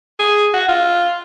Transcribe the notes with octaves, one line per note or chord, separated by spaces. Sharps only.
G#4
F#4
F4